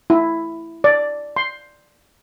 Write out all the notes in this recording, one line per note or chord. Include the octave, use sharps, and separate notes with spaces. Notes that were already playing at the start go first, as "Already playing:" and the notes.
E4
D5
C6